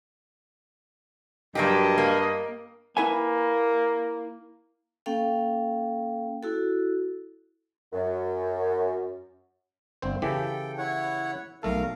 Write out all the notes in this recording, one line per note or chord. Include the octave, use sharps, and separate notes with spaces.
G2 F#3 A#3 G4 D#5
A#3
A#3 E4 B4 G#5
A#3 C#4 A4 F5 G5
E4 F#4 A4
F#2
G1 C4 C5
C#3 E3 G4 A4 G5
E4 C#5 F#5
B1 A3 A4 A#4 F5